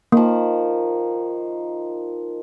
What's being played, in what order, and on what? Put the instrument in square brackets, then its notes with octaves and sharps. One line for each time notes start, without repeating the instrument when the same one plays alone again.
[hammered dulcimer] D#3 F3 [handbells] A#3